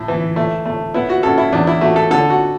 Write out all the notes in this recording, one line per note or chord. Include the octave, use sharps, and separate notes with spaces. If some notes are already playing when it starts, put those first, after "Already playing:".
Already playing: A2
E3
A3
A3
B3 E4
F#4
F#2 A4
E4
E2 D4
E4
A3 F#4
A4
D3 A4
F#4